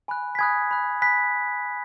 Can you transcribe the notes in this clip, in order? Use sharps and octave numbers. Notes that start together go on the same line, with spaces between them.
G#5 B5 F#6
B6
G#5 B5 D#6 F#6 G#6
B5 F#6
G#5 B5 F#6 B6